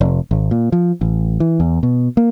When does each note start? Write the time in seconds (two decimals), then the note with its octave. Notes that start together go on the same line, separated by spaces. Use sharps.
0.01 F1
0.31 G#1
0.51 A#2
0.72 F3
1.01 A1
1.40 E3
1.60 E2
1.83 B2
2.17 A#3